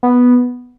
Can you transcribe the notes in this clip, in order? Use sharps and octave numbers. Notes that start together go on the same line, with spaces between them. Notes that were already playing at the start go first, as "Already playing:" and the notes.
B3